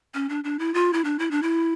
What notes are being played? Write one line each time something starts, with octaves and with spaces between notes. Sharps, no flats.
C#4
D4
D4
E4
F4
E4
D4
E4
D4
E4